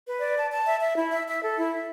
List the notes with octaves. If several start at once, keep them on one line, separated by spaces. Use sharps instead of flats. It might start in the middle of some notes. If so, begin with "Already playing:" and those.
B4
D5
A5
A5
E5
E5
E4
E5
E5
A4
E4
E5